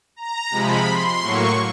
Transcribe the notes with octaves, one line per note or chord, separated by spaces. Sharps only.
A#5
C3 F3 G#3 B5
C6
A2 F#3 A#3 C#6